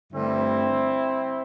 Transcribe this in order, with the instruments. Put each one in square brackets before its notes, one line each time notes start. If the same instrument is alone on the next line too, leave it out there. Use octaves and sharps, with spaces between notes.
[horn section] G2 D3 A3 C4 E4